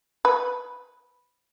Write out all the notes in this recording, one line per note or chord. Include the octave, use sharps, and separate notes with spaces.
B4